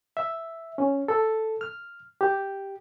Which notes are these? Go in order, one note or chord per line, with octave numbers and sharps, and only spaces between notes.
E5
C#4
A4
F6
G4